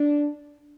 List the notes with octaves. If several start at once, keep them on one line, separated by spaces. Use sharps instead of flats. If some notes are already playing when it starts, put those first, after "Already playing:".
Already playing: D4